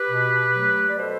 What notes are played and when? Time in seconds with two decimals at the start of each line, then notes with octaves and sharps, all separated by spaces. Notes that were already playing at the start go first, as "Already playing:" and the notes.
Already playing: G4 B4
0.09 B2
0.53 F#3 A3
0.88 D5
0.98 B2 A4 C5